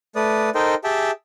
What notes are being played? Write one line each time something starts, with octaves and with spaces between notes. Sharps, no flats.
A3 B4 D5 D#6
D#4 A4 A#4 C5 D#5 G5
G4 G#4 E5 G5 A5